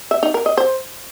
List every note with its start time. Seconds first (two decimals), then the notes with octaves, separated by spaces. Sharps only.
0.11 E5
0.23 D#4
0.34 A#4
0.46 D#5
0.57 C5